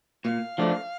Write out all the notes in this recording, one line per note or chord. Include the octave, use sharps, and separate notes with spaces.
A#2 F5
F3 A3 D4